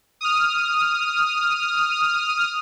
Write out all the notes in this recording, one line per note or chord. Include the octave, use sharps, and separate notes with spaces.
D#6 F6